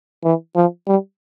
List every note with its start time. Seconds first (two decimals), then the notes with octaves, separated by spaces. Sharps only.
0.23 E3
0.55 F3
0.87 G3